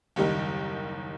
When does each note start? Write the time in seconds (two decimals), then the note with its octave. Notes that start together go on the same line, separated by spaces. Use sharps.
0.16 F#1 D#2 G3 D#4 G4 A#4